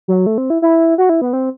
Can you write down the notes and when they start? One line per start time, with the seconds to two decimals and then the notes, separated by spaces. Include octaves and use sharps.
0.08 F#3
0.26 A3
0.38 C4
0.50 E4
0.62 E4
0.98 F#4
1.09 E4
1.22 B3
1.33 C4